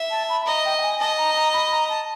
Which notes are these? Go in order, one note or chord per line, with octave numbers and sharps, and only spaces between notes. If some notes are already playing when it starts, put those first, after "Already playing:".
Already playing: E5
A5
B5
D#5 A#5
G5
G5
G#5
D#5 A5
A#5
A#5
B5
A#5
A5